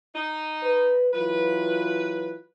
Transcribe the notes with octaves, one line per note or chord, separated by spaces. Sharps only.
D#4
B4
E3 F#3 F4 B4